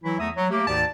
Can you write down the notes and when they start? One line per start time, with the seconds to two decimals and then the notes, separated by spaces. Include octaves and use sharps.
0.04 E3 F#3 E4
0.19 E2 A3 E5 A#5 D#6
0.36 F#3
0.50 A3 A#3 G4
0.67 D2 G#2 D#3 D5 A5